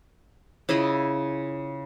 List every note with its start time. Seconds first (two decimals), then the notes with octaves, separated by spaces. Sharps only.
0.69 C#3 E4 F4 D#5